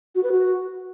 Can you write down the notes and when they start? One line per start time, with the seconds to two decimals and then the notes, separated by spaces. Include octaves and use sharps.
0.15 F#4
0.23 B4
0.32 F#4